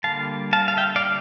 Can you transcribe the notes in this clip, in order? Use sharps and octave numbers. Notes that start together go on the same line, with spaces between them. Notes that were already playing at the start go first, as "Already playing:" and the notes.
D3 G3 A#3 F5 A5
F5 A5
F5
E5 G5
D5 F5